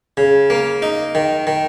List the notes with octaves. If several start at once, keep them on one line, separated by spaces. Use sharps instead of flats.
C#3
A#3
D#4
D#3
D#3